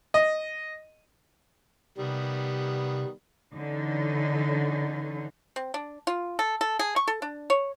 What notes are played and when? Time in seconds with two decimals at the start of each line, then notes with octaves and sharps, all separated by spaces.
0.14 D#5
1.98 C3 D#3 G3 B3
3.56 D3 E3 C#4 D#4
5.56 C4
5.74 D4
6.07 F4
6.39 A4
6.61 A4
6.79 G#4
6.96 C#6
7.08 A4
7.22 D4
7.50 C#5